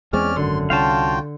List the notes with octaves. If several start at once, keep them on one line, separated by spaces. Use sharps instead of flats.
E2 G#3 C4 C#4 D5 F6
G#1 F#2 D3 C6
C2 C#4 F4 F#4 F5 G5 A5